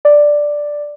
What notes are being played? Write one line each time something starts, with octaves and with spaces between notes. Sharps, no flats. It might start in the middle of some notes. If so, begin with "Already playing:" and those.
D5